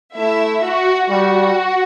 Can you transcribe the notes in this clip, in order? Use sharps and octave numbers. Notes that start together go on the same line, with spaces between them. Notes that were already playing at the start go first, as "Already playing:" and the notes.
A3 E4 E5
F#4
G3 F#4